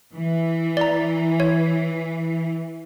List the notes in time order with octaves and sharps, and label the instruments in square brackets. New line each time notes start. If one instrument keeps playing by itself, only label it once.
[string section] E3
[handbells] D5 A#5
C#5